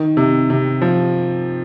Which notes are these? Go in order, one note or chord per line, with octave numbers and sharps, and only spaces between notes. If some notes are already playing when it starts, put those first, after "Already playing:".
Already playing: D#3
C3
C3
F3